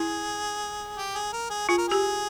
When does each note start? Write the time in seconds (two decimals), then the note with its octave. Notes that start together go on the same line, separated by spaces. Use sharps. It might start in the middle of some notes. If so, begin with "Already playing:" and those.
Already playing: E4 G#4
0.97 G4
1.15 G#4
1.33 A#4
1.50 G#4
1.68 F4 G#4
1.78 A#4
1.89 G4 G#4